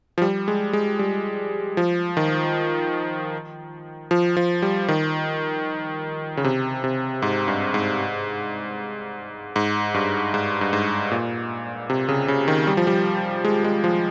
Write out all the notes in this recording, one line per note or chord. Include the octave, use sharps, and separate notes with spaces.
F3
G3
G#3
G#3
G3
F3
D#3
F3
F3
G3
D#3
C#3
C3
C3
G#2
G2
G#2
G#2
G2
G#2
G2
G#2
A#2
C3
C#3
C#3
D#3
G3
F3
G3
G#3
G#3
F3